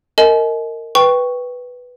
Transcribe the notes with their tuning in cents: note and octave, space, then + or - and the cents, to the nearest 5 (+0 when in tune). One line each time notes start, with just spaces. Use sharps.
A#4 -25 D#5 +15 G#5 +40
B4 +0 G5 +0 C#6 +0